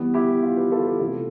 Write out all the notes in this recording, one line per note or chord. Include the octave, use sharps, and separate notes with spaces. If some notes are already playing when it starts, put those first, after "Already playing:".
Already playing: E3 G3 B3
E4 G4
F4
G4 B4
F4 A4
G4 B4
C3 E3 A3 F4 A4